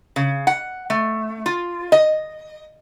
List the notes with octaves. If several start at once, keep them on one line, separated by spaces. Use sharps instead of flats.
C#3
F#5
A3
F4
D#5